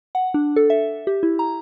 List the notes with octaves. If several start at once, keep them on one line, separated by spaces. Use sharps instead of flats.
F#5
D4
A4
E5
G4
E4
A#5